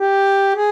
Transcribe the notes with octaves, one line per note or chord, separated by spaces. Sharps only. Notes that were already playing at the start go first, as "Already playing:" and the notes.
Already playing: G4
G#4